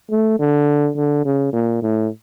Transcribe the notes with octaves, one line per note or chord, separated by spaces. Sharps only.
A3
D3
D3
C#3
A#2
A2